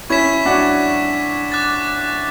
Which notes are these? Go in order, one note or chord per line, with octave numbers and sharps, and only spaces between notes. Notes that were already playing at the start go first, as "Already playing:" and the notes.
C#4 E4 C#6 G#6 B6 E7
D4 F#4
D6 F#6 A6